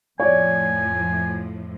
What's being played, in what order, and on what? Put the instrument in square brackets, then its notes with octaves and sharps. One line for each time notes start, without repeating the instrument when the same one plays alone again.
[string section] F2 A2 F3 [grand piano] C#5 D5 [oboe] G#5